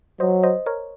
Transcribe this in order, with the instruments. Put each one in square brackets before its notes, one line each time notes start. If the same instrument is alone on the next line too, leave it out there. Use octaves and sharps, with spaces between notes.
[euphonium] F#3 [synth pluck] C5 D#5
[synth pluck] C5 D#5
A#4 C#5